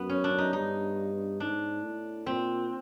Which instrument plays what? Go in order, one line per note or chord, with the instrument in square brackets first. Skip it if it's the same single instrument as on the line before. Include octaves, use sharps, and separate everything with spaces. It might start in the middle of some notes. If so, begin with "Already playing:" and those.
Already playing: [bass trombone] F#2 [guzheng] B3
[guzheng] C#4
D4
D#4
[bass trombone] G2 [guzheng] D#4
[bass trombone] G#2 [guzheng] D4
[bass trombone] A2
[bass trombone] A#2 [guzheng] C4